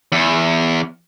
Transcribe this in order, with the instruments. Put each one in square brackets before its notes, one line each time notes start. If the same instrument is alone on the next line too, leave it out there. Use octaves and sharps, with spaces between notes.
[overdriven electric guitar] E2